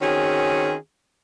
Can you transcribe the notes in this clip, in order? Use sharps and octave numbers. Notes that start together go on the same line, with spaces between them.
D#3 C4 C#4 F#4 G#4